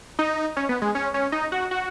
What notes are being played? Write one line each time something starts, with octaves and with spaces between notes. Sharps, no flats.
D#4
C#4
B3
G#3
C#4
C#4
D#4
F#4
F#4